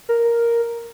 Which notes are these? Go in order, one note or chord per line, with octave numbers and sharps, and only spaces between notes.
A#4